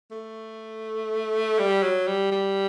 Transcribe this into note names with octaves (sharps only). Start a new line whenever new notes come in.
A3
G3
F#3
G3
G3